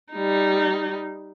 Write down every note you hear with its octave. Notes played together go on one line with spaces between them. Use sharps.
G3 D#4